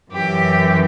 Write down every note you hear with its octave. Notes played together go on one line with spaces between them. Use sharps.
F#2 E3 G4